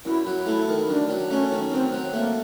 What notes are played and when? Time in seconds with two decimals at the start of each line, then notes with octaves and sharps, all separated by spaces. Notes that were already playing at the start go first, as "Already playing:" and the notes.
0.05 F#2 E4
0.26 F#3
0.46 A3 E4
0.68 D#3
0.88 F#2 D4
1.09 F#3
1.31 A3 C#4
1.51 D#3
1.72 F#2 C4
1.92 F#3
2.13 A3 A#3